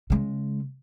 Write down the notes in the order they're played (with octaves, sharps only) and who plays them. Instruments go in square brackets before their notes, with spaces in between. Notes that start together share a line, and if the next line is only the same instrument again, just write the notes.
[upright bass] C#3 G#3